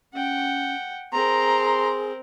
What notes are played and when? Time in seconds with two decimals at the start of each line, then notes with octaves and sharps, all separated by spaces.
0.14 C#4 F#5 G5
1.13 C4 G#4 A#4 A#5 C6